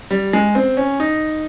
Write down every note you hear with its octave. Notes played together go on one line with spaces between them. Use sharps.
G3
G#3
C4
C#4
D#4